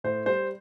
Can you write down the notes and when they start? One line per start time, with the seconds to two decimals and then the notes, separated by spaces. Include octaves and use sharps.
0.04 A2 C5
0.26 G3 C5